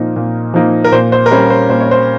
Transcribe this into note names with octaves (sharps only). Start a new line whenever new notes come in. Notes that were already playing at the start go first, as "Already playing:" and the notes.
Already playing: A#2 F3 A#3 D#4
A#2
F3 A#3 D#4
A#4
A#2 C5
C5
A#4
G3 C#4 C5
C5
A#2 C5
C#5
C5